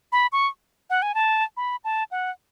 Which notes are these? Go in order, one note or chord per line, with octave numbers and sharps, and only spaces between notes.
B5
C#6
F#5
G#5
A5
B5
A5
F#5